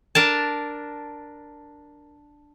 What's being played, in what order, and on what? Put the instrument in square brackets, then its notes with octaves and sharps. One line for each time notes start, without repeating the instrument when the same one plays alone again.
[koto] D4 A#4 A5